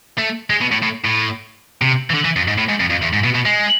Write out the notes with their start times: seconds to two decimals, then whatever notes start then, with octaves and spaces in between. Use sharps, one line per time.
0.18 A3
0.50 G#3
0.61 B2
0.72 A2
0.83 A2
1.05 A2
1.82 C3
2.10 E3
2.14 D3
2.25 E3
2.36 F2
2.48 G#2
2.58 A2
2.69 G#2
2.80 F2
2.90 F2
3.02 E2
3.13 G#2
3.24 B2
3.35 B2
3.46 G#3